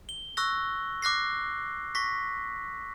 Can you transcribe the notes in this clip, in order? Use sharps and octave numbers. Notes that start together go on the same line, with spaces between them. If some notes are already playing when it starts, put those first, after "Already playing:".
G7
C#6 E6 F#6 A#6
D6 F#6 A#6 C7
C#6 A#6 B6